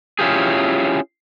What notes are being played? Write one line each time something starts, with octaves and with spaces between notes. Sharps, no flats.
C#4 E4 F4 G4 G#4